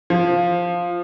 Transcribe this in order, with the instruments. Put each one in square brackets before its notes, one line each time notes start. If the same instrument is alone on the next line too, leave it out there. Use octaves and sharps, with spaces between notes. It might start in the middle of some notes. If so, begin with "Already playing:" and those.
[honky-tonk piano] F3